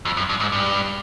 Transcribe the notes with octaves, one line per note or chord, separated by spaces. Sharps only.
F2
F#2
G2
G#2
G2